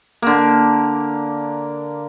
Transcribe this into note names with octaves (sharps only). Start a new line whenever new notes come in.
D3 A#3